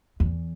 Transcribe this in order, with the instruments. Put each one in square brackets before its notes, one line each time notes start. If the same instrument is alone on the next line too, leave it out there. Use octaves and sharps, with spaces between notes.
[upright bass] E2